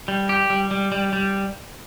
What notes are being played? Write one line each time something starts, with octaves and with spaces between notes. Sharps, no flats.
G3
G4
G3
G3
G3
G3